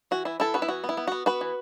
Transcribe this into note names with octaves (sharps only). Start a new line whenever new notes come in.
E3 F#4
E3 E4
E3 E4 A4
B3 F#4 B4
E4
E3 F#4
B3
E4
B3
B3 F#4
B3 F#4 B4
E3